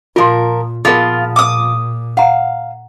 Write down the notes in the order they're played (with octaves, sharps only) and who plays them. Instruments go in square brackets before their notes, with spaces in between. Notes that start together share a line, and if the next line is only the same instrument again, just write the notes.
[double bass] A#2 [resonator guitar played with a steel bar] F3 A#4 [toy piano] F4 C6
[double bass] A#2 [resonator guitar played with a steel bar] F3 B3 [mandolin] F4 [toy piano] G#4 A#4
[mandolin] D6 D#6
[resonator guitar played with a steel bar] F5 [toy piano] F#5 A#5